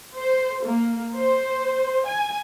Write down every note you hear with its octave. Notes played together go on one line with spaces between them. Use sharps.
C5
A#3
C5
G#5